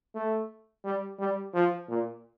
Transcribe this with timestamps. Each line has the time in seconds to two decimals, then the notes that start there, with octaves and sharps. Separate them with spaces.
0.15 A3
0.84 G3
1.19 G3
1.54 F3
1.89 A#2